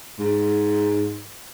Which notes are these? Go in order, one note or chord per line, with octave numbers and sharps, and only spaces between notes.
G#2